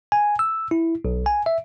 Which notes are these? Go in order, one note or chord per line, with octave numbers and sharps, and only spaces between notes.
G#5
E6
E4
B1
G#5
E5